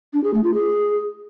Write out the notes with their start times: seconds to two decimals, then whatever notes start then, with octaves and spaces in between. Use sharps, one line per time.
0.13 D4
0.23 G#4
0.33 A3
0.44 F4
0.54 G#4